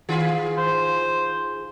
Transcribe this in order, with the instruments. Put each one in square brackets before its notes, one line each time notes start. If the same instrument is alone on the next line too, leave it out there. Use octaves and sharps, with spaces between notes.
[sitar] D#3 F4 G#4
[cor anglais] C5